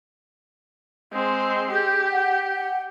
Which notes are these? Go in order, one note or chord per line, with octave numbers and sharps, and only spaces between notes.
G#3 C4
G4 G#4 G6
F#5
F#5